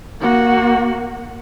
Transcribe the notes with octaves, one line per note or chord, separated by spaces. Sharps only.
A#3 F#4